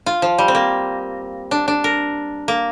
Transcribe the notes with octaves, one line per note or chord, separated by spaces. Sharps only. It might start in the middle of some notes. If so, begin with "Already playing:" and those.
F4
F3
G3
C4
A#3
D4
D4
A#4
A#3